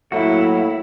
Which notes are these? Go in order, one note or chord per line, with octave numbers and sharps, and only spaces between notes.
A2 F#3 A#3 E4 F#4